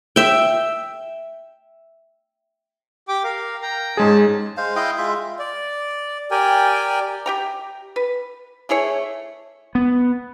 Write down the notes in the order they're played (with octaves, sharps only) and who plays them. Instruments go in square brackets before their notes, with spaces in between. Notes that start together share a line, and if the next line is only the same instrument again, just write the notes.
[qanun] E5 G5
[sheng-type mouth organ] G4 G5 D6
A#4 F5
G5 A#5
[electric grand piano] G#2 G#3 G#4 [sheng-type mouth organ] C#4 A5
[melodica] G#3 C5 F5
E4 D#5 F5 G5
G#3 F4 E5
[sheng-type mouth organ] D5
G4 A#4 D5 G5 G#5
[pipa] G4 G5 A#5
B4
A3 E4 G#4 C#5
[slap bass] B3